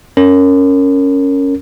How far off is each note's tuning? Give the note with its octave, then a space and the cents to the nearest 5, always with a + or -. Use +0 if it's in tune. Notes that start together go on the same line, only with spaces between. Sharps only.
C#4 +0 A#4 -15